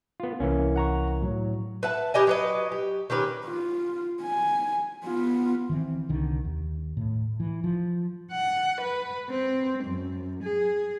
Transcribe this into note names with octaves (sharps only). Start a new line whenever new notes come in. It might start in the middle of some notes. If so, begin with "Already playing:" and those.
B3 F4
C2 E3 A#3 C#4
F#5 A#5 C#6
A2 F#3
B4 E5 F#5 A5
E4 G4 D#5 G#5
F#3 B4 D#5
G4
D#3 C#4 G4 B4
F4
G#5
B3 F4
D#3 E3 C4
C2 D3 D#3
D#2
A2
E3
F3
F#5
B4
C4
F#2
G#4